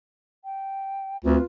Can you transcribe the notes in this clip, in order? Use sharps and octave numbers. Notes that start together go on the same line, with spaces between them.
G5
D2 C4 F4 B4